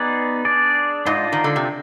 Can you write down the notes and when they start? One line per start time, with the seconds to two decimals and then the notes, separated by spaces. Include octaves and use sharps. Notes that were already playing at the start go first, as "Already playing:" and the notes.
Already playing: B3 D#4 G#4 D5
0.45 D4 G#4 D5
1.06 G#2 D4 F4 C5 D#5
1.32 D#3
1.44 D3
1.56 C3